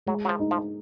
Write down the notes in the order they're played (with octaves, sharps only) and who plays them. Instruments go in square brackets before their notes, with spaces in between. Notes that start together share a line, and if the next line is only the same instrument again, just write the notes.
[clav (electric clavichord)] F#3 [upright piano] G#3
[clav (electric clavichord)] F#3
F3
[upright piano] D#4
[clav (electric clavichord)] F3